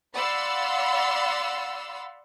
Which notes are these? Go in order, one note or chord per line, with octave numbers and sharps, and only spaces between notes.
D5 F5 F#5 B5 C6 E6